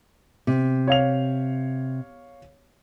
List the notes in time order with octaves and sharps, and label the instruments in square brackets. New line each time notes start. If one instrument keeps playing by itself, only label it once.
[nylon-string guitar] C3
[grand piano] C#5 F5 F7